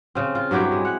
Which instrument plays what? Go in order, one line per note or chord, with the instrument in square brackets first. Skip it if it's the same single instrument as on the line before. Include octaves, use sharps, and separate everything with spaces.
[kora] C#3 C4
F4
G2 F#3 E4 G4
G#3
F#5